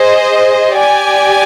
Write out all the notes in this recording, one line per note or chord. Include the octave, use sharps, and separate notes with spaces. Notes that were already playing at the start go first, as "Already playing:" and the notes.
Already playing: G#4 C5 D#5
G4 D5 G#5